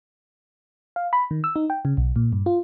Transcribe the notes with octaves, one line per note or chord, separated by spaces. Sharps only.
F5
B5
D#3
E6
D#4
G5
C#3
B1
A#2
G2
F4